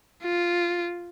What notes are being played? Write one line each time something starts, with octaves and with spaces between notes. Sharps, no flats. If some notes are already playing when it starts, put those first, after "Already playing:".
F4